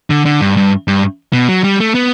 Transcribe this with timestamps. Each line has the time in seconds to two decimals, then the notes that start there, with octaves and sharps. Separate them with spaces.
0.10 D3
0.25 D3
0.41 G2
0.57 G2
0.88 G2
1.33 B2
1.49 F#3
1.64 G3
1.80 A3
1.95 B3